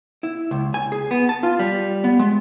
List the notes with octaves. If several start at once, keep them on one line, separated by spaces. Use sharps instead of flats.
E4
C#2
G#5
G#4
B3
A5
F4
G3
B3
G#3